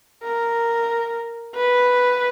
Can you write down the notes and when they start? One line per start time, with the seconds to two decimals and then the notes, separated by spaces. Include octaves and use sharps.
0.24 A#4
1.55 B4